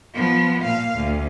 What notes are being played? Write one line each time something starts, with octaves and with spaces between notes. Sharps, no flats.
F3 B3
A#2 F5
D2